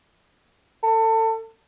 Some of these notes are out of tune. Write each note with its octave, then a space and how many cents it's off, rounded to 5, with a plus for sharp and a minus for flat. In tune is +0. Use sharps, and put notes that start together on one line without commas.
A4 +30